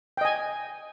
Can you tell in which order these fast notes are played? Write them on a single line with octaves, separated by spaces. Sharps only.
G5 D#5 G#5